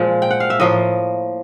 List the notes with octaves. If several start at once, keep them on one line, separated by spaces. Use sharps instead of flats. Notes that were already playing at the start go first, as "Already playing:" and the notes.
Already playing: A#2 F3 G#3
G5
F#5
F5
E5
A2 F3 A#3 D#5